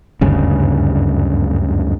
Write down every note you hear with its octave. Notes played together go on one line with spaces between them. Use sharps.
F#1 D2 G2 C#3